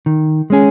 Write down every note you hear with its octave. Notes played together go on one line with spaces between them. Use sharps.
D#3
G#3 C#4 G#4